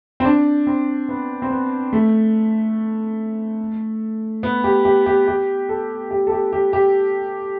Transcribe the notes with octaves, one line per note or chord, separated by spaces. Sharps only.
C4
D4
C4
B3
C4
B3
A3
B3
G4
G4
G4
G4
A4
G4
A4
G4
G4
G4